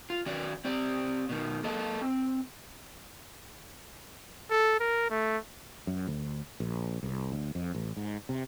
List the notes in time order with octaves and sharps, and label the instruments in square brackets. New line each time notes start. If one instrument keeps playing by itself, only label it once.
[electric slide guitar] F4
D#3 C#4 F#4 D5
C4 G4 D5
B2 D#3
A#3 A4 D#5 A5
C4
[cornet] A4
A#4
A3
[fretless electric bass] F#2
D2
A#1
C2
D2
F2
A1
G#2
C3